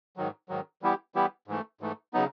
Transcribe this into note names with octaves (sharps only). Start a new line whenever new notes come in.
G#2 D#3 F#3
G#2 D#3 F#3
E3 G3 B3 E4 G4
E3 G3 B3 E4 G4
G#2 E3 A3
G#2 E3 A3
C#3 F#3 B3 D#4